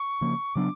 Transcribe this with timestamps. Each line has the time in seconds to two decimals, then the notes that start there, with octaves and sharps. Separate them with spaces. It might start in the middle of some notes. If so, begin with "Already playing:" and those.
Already playing: C#6
0.21 C#3 F3 A#3
0.55 C#3 F#3 B3 D4 D6